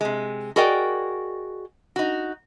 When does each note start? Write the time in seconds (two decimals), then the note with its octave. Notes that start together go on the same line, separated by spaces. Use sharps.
0.01 C3 G#3
0.56 F#4 G#4 A#4 D5 D#5 G5
1.96 D#4 F#4